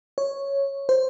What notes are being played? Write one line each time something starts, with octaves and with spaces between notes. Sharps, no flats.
C#5
C5